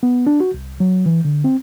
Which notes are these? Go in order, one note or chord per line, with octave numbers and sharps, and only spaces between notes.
B3
D4
F#4
C2
F#3
E3
D3
C4